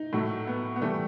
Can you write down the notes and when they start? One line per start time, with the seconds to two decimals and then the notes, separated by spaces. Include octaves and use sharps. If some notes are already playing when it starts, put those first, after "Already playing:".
Already playing: D#4
0.13 A2 F#3 A3
0.47 B3
0.76 B3
0.81 A2 E3 G3 A3